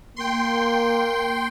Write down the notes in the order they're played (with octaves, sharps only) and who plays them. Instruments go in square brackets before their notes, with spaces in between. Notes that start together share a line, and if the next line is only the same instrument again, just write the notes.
[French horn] A#3 [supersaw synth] G5 C6